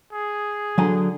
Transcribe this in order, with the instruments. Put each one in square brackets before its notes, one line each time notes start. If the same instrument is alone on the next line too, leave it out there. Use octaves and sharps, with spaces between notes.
[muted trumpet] G#4
[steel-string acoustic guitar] D3 [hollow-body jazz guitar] F#3 G#5 A#5